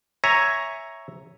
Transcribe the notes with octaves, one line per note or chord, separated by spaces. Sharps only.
C#5 E5 G#5 A#5